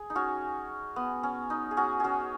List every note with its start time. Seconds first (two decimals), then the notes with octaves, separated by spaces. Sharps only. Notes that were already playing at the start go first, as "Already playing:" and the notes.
Already playing: G#4
0.10 D#4
0.15 C#4 F#4
0.96 B3
1.23 C#4
1.50 D#4
1.71 G#4
1.77 C#4 F#4
2.00 C#4 F#4 G#4